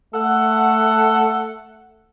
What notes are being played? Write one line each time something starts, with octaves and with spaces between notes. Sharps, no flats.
A3 A4 F#5